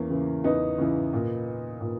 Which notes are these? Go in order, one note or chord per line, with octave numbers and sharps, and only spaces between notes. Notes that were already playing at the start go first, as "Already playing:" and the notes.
Already playing: E2 A#3 C#4
C#3 E3
E2 B3 D#4
C#3 E3
A#2
A#2